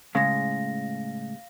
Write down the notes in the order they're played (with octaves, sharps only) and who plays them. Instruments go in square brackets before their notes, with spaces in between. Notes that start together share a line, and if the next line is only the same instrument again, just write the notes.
[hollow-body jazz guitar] A2 C#3 G#3 [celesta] F5 A#6